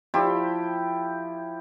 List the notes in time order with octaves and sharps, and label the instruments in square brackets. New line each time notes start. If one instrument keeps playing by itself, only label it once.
[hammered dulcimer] F3 E4 G4